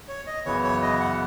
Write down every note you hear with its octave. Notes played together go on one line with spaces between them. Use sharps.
C#5
D#5
F#2 C#3 E3 B3 C#5
C#5
D#5
F#5